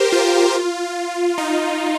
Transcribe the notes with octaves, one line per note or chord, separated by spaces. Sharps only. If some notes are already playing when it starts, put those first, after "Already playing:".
Already playing: G4 A#4 C5
F4
D#4